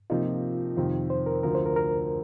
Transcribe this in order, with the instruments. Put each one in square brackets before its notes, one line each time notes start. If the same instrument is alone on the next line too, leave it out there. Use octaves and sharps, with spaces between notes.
[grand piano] C3 F3 A#3 D#4 [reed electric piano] F4
[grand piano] F2 C3 D#3
[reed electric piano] C5
A#4
[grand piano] D2 D3 F3 [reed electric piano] A#4
[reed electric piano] C5
A#4
A#4